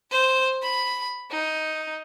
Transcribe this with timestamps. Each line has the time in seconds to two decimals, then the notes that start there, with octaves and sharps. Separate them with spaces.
0.11 C5
0.63 B5
1.31 D#4